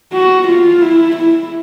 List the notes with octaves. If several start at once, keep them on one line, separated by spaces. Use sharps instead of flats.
F#4
F4
E4
E4